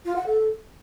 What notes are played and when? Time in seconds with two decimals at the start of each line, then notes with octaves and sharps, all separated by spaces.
0.05 F4
0.16 F#5
0.26 A4